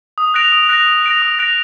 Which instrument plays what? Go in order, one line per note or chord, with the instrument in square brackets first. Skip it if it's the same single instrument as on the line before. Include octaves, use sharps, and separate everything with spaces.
[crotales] D#6
F#6 A#6 D7 F7
D#6
F#6 A#6 D7 F7
D#6
F#6 A#6 D7 F7
D#6
F#6 A#6 D7 F7